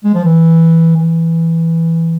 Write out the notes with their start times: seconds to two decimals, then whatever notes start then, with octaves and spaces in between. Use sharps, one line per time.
0.04 G#3
0.15 F3
0.24 E3
0.96 E3